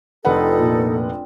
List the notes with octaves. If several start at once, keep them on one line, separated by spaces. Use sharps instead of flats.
F1 C4 D4 D#4 F4 A4 B4 F#5
A#2